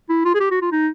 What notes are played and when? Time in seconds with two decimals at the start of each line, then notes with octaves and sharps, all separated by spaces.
0.09 E4
0.25 F4
0.35 G#4
0.40 G4
0.51 F#4
0.62 F4
0.72 D#4